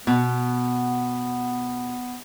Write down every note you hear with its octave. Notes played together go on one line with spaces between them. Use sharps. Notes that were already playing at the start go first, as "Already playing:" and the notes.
B2 B3